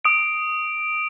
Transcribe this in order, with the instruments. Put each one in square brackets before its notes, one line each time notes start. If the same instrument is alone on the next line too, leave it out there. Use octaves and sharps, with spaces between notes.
[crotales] D#6 D7